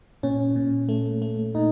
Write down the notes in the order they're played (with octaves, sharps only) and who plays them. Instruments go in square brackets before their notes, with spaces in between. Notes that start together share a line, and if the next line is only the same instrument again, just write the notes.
[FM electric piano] A#2 C#4
A#2
A3
A3
A#2 D#4